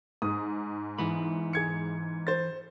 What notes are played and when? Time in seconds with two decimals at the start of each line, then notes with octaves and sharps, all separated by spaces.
0.22 G#2 D#6
0.98 G#2 E3 B3 B5
1.53 G#4 G#6 C#7
2.27 C5 A6